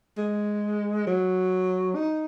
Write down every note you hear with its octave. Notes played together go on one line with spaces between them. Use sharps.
G#3
F#3
D#4